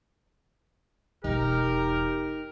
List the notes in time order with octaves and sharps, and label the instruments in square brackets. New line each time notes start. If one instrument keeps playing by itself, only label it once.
[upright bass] E1 B3 [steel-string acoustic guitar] D#4 [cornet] G4 [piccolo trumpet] A#4